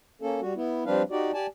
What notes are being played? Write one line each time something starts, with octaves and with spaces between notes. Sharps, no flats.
A#3 C#4 A4
G3 F#4
B3 E4
F3 G3 C4 D4 B4 F5
D#4 F#4 G4 D5
G4 D5 G#5 A5